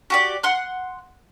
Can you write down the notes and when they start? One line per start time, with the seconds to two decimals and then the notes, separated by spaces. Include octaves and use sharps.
0.10 F#4 G4 D5
0.43 F#5 C6 F#6